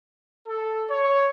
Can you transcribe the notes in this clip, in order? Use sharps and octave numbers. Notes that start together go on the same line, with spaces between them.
A4
C#5